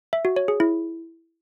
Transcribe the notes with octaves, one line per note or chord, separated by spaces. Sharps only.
E5
F#4
C#5
G#4
E4